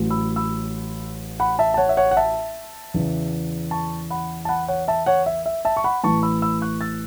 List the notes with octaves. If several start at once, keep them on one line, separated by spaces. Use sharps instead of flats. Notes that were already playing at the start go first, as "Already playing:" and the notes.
Already playing: A1 A2 F#3
B5 E6
B5 E6
F#5 B5
E5 A5
A5
C#5 F#5
E5
C#5 F#5
F#5
E5 A5
E2 C#3 E3
A5 C#6
F#5 B5
A5
F#5 B5
C#5 F#5
E5 A5
C#5 F#5
E5
E5
E5 A5
C#6
F#5 B5
A1 A2 E3 A5 C#6
B5 E6
B5 E6
C#6 F#6
E6 A6